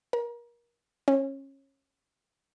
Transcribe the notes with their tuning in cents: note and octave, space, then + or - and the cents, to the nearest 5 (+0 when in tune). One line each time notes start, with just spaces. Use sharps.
A#4 +30
C#4 -25